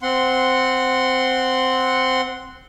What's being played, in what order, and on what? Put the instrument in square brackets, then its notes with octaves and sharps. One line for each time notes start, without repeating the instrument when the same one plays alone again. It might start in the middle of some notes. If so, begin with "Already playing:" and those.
[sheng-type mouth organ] C4 F#5 C6